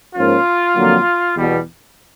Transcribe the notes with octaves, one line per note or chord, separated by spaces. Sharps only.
G#2 F3 A#3 C#4 F4
F2 D3 F#3 A#3
E2 B2 G3